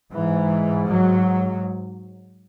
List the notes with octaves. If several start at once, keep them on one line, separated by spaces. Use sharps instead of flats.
G#2 E3
F#3